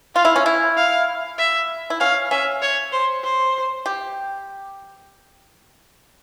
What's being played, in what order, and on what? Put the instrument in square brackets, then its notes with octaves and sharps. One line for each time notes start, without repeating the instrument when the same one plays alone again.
[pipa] F4 [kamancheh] F5
[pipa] E4
C#4
E4
[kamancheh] F5
E5
[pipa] E4
[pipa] C#4 [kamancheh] F5
[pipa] C#4 [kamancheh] E5
[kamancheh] C#5
C5
C5
[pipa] G4